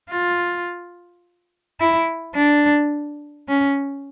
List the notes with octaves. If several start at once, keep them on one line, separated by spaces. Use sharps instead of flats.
F4
E4
D4
C#4